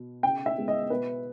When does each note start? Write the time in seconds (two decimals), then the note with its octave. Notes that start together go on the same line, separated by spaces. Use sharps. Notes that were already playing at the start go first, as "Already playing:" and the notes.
Already playing: B2
0.23 C#3 G5
0.46 E5
0.57 G#3 B3
0.68 D#5
0.90 B2 B4